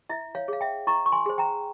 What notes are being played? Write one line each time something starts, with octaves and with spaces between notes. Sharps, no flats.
E4 E5
C#5 F5
G#4 C#5 F5
E5 G5
E4 A#5 C#6
C#6
G#5 C6
G#4 C5
G5 A#5